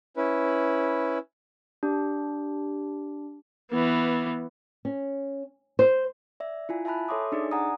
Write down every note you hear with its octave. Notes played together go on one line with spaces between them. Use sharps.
C#4 E4 B4
D4 G4
E3 B3
C#4
C5
D5 E5
E4 F4 G#5
E5 G#5 A5 B5 F#6
A4 C#5 E5 C6 D6 D#6
D4 D#4 G#4 D5
D5 F#5 G#5 A#5 D#6